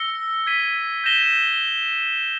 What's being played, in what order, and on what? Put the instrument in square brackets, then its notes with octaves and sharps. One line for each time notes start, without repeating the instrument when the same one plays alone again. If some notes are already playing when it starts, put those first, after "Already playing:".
Already playing: [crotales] E6 A#6 C#7 G7
G#6 B6 D#7
G6 A#6 E7 G7